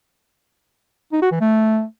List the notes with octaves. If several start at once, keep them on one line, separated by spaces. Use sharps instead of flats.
D#4
F#4
E3
A3